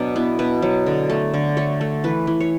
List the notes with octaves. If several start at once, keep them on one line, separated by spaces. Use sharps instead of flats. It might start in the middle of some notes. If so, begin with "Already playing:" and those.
Already playing: B2 F#3 D4
B3 E4
B2 B4
F#3
D3
A3
D3
A3 C#5
A3
E3 B4
E3
C#5